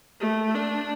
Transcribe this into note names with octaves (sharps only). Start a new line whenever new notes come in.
A3
D4